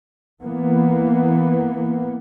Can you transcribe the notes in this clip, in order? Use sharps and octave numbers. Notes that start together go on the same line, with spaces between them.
E3 A#3 B3